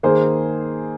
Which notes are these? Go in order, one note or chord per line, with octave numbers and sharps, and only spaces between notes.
D#3 A#3 G#4 C5